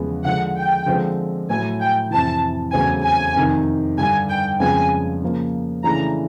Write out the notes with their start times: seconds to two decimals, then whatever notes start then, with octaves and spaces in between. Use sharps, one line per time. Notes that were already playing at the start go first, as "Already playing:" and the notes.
Already playing: E2 C#3 F3 G#3 B3
0.24 D3 F3 G#3 F#5
0.56 G5
0.86 D3 F3 G#3 C4
1.49 A2 F#3 A3 G#5
1.80 G5
2.11 F2 C3 E3 A5
2.73 E2 C#3 F#3 A3 C4 G#5
3.04 G#5
3.36 F2 C3 D#3
3.98 G2 D3 G3 G#5
4.29 G5
4.60 F2 C#3 F3 G#3 B3 G#5
5.22 C#3 F3 A#3
5.84 C#3 E3 A3 D4 A#5